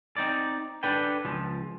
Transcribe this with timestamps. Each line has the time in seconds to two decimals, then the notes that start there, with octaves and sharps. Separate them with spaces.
0.17 C4 D#4 D5
0.83 D4 A4 B4 G5
1.25 C#2 F3